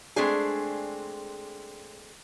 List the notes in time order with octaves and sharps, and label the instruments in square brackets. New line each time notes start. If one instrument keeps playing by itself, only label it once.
[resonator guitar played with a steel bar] G#3 A3 C4 D4 G#4